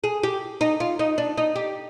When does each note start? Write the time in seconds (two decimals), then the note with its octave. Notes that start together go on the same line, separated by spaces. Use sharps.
0.04 G#4
0.23 G4
0.61 D#4
0.80 F4
0.99 D#4
1.18 D4
1.37 D#4
1.55 G4